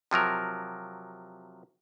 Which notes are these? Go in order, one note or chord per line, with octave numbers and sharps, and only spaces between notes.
C3 F3 F#3 A#4